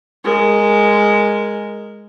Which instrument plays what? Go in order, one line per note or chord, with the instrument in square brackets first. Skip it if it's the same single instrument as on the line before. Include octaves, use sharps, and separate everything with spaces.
[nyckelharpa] G#3 A#4